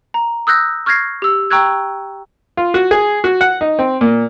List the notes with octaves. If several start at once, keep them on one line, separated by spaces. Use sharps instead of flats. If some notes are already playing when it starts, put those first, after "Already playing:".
A#5
D#6 E6 F#6 G6 A#6
C#6 F6 G6 G#6 A#6 C7
G4 E6
G5 A#5 C#6 E6 F#6 G#6
F4
F#4
G#4
F#4
F#5
D#4
C4
A#2